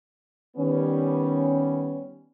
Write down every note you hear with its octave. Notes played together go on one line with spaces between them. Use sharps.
D#3 G3 B3 C#4